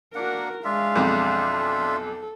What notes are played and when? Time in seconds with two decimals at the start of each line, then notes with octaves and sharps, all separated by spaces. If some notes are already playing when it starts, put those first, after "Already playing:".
0.15 A#3 D4 F#4 A#4 F#5
0.64 G#3 D4 F4 E5 F5
0.95 B1 F2
1.57 A4